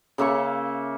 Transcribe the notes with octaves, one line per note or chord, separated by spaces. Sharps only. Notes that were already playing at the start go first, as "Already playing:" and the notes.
C#3 A#3 E5 C#6